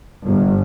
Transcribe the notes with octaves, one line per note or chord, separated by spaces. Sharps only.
G1